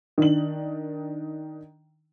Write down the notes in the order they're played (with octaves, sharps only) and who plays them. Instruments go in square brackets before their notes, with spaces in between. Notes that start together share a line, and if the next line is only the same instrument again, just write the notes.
[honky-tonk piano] D#3 D4 F#7